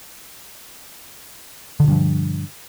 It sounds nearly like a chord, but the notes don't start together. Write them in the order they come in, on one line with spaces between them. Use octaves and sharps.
D3 B2 G2 F3